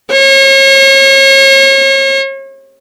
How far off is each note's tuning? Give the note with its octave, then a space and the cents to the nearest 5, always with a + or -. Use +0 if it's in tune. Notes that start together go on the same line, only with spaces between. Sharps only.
C#5 -40